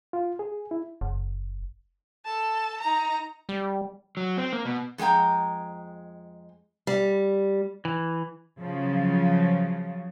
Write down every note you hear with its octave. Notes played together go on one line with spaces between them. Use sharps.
F4
G#4
E4
F#1
A4 A5
D#4 A#5
G3
F#3
C4
A#3
B2
F2 G#3 C#4 G5 A#5
G3
E3
C#3 F3 F#3